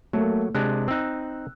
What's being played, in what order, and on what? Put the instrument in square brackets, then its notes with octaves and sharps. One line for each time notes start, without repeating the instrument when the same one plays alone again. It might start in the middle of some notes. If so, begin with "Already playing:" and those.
[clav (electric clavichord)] F#3 [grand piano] A3 A#3
[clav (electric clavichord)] C3 G#3 D4 [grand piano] F#6
[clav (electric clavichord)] C4 D#4 [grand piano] E6 F#6